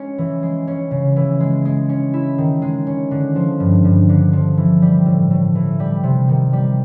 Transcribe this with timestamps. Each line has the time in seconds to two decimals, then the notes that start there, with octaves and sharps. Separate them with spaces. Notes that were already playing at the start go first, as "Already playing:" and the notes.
Already playing: G#3 C#4
0.18 E3
0.43 G#3
0.67 C#4
0.91 C#3
1.16 E3
1.40 G#3
1.65 G#3
1.89 C#4
2.14 E4
2.38 D#3
2.62 G#3
2.87 C#4
3.11 D3
3.35 F3
3.60 G2
3.85 G2
4.09 D3
4.33 F3
4.57 E3
4.82 G3
5.06 A2
5.31 A2
5.55 E3
5.80 G3
6.03 C3
6.28 D#3
6.53 G3